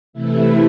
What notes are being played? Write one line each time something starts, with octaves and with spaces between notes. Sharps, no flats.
C3 E3 A3 E4